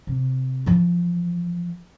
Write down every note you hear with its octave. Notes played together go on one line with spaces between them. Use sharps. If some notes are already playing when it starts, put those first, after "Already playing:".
C3
E3 F3